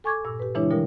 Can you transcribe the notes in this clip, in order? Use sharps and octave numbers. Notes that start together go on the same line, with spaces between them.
A4 G#5 C#6 D6 G#6
G2 A#2 E6
G4 B4
C#3 E3 G#3 D4 E4 C#5
B2 D3 F3 G3 A#4